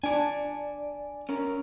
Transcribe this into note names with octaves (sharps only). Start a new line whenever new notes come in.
D4 D5 G#5
C#4 A#4